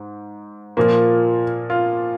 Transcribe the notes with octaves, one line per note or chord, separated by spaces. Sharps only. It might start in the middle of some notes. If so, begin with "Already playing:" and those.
Already playing: G#2
A#2 F3 A#3
F4